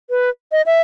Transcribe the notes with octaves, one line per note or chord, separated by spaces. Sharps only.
B4
D#5
E5